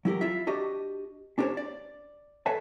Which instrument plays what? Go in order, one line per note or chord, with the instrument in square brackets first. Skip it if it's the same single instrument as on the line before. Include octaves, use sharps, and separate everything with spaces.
[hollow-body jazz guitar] F#3 E4 G4 A#4
E4 F4 E5
D4 F#4 G4 D5 D#5
C#4 D4 G4 A#4 C5 C#5
D5
A4 B4 C#5 E5 G#5 A5